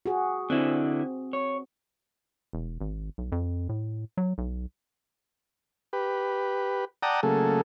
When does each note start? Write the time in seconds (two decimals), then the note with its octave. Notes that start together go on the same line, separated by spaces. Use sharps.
0.06 F#4 G#4
0.50 D3 C4 E4
1.33 C#5
2.53 E1
2.81 G#1
3.18 B1
3.32 F2
3.69 A2
4.17 F#3
4.38 B1
5.93 G4 B4
7.03 D5 F#5 G5 A5 A#5 D#6
7.23 C#3 F#3 A3 A#3 G#4 A4